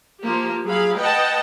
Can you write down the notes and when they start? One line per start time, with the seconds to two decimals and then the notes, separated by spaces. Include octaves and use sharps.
0.22 F3 A#3 G4
0.66 F#3 G#4 F5 B5
0.97 B4 D#5 F#5 G5 A5